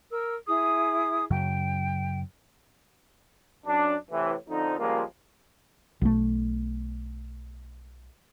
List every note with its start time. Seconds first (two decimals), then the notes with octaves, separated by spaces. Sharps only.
0.11 A#4 E6
0.46 E4 G#4 D#6
1.31 F#2 C#3 F#3 G5
3.66 F#2 D4
4.11 A2 C3 E3
4.48 F2 D3 F3 D#4
4.78 C#2 F3 G3 G#3 A#3 F4
6.02 B1 A3